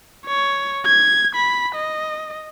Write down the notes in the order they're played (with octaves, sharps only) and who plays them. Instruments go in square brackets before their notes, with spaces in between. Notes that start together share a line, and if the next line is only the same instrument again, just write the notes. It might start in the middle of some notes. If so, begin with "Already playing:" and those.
[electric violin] C#5
G#6
B5
D#5